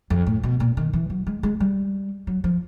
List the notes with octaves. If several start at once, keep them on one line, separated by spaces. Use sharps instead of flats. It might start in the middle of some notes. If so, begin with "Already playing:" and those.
F2
A2
B2
A#2
D#3
E3
F#3
G#3
G#3
G3
F#3
F3